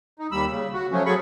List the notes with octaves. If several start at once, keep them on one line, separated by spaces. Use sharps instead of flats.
D#4
D#2 G3 B5 E6
C#3
F#4
F3 F#3 A3 C#4
F#3 G#4 A4 B5 C#6